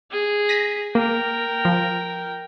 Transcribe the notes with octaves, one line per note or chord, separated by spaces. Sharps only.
G#4
A#6 B6 D#7
A#3 A#4 G5
F3